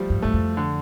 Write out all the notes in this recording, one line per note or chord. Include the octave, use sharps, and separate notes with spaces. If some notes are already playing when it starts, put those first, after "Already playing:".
Already playing: F3 G3 A3
G2
G2 A3
F2
D3